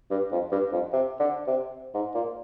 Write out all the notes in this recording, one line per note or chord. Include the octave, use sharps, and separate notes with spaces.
G2
F2
G2
F2
C3
D3
C3
G#2
A#2